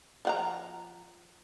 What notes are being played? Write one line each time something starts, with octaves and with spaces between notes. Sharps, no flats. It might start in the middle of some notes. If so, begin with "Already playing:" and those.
F3 F#5 A#5